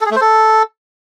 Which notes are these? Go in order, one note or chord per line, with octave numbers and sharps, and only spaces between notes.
A4
G#4
A3
C5
A4